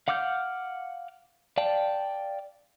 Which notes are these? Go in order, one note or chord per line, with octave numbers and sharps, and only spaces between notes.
F5 F#5 D6 F6 G6
D5 F5 G5 A5